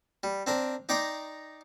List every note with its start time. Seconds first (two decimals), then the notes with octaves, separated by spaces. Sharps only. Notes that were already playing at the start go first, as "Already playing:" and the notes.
0.23 G3
0.47 C4 D4 A#4
0.89 D#4 D5 G5 A#5 C6 D6